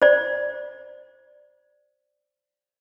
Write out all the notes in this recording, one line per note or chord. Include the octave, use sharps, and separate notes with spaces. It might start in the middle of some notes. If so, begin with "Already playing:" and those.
C5 D5